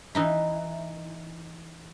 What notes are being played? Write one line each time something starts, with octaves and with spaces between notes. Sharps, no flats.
E3 D#4 E4